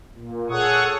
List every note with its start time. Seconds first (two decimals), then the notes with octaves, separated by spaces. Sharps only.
0.16 A#2
0.50 G#4 A4 C#5 F#5 C#6 D#6